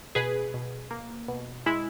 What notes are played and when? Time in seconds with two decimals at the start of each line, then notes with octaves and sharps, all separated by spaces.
0.15 B2 G#4 B4
0.54 B2
0.91 A#3
1.28 B2
1.66 G#3 E4